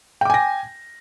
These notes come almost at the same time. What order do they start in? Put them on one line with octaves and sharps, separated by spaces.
G5 D6 G#5 A#6